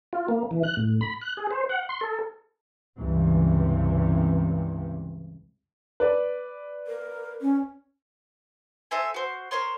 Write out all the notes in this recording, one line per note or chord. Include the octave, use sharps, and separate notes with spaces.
F4
A#3
E3
F#6
A2
B5
F#6
G#4
C5
F#5
C6
A4
C#2 G2 C3 E3
B4 D5
A#4
C#4
A4 C5 E5 G#5
F#4 C5
A#4 C5 C#5 C6